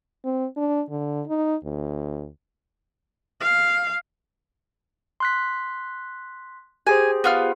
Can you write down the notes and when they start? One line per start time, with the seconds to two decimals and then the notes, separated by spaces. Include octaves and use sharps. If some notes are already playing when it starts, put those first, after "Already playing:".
0.25 C4
0.57 D4
0.90 D3
1.28 D#4
1.64 D2
3.41 F5
5.20 C6 F#6 B6
6.87 G4 G#4 C5 G#5
7.24 B3 F4 F6